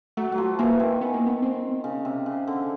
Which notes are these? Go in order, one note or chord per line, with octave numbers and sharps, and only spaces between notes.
F#3 A3
F#3
F3
E3 A#3
D#3
B3
A#3
B3
C4
C#3
C3
C#3
D3